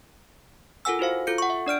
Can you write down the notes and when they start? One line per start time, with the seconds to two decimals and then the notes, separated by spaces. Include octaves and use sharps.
0.85 F4 A4 A#4 F#5 G#5 E6
0.99 E4 F#4 C5 F5
1.27 F4 A4 G6 C#7
1.38 F#5 C#6
1.50 E5
1.66 D4 D5 F6 D7